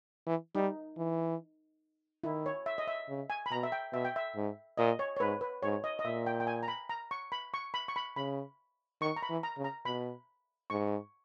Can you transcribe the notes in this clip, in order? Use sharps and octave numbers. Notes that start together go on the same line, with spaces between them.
E3
G3 D#4
E3
D#3 E4
C#5
E5
D#5
E5
C#3
G#5
B5
B2 A#5
E5
G5
B2 E5
G5
E5
G#2
A#2 D#5
C#5
C#5
G#2 B4
B4
G#2 C#5
D#5
D#5
A#2 E5
G5
G5
G#5
A#5
B5
A#5
C#6
B5
C#6
B5
C#6
B5
C#3 B5
D#3 C#6
A#5
B5
E3
A#5
C#3
A#5
B2 B5
G#2 C#6